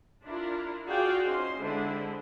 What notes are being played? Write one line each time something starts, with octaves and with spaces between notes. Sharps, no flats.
D4 E4 F4 A#4
F4 F#4 G#4 D5 F5 G5
C#4 D#4 C5 C6
D3 G#3 C4 D4 E4